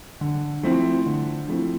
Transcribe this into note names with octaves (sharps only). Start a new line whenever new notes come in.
D3
F3 A3 C4 E4
D3
F3 A3 C4 E4